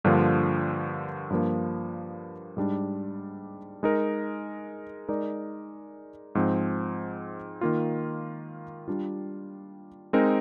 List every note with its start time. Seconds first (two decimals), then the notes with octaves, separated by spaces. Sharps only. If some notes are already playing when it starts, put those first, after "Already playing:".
0.04 G2 D3 F3 A#3 F4
1.30 G2 F3 A#3
2.57 G#2 G3 D4
3.83 G#3 D#4 A#4
5.09 G#3 D#4 A#4 D5
6.35 G#2 F3 C4
7.61 D#3 A#3 F4
8.88 G3 D4 F4
10.13 G#3 C4 D#4 A#4